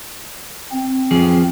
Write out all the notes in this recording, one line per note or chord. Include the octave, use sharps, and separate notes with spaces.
C4
F2 F3 G#4